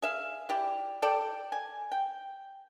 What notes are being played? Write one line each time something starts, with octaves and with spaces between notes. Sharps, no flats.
G#4 E5 F5
E4 G4 D5
A4 D5 G5
G#5
G5